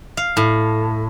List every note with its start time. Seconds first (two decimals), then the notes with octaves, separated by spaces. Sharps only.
0.17 F5
0.37 A2